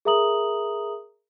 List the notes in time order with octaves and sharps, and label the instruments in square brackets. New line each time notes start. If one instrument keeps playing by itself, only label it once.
[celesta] G#4 A#4 E5 A#5 D#6 F#7